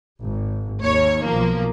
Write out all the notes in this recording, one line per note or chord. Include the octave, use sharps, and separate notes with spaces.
G#1
D#2 C#5
B1 F3 A#3